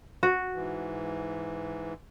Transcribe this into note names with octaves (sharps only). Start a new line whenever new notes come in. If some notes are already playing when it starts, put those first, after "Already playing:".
F#4
G#2 E3